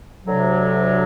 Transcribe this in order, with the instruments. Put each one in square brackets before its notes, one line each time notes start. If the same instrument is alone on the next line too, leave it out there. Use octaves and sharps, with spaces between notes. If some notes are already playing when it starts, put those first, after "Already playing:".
[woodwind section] D2 C3 F#3